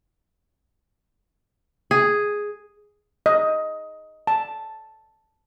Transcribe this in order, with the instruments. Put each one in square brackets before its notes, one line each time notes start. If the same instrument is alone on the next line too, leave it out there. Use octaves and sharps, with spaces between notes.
[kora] G#4
[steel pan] D#5
A5